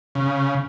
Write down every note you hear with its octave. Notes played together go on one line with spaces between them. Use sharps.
C#3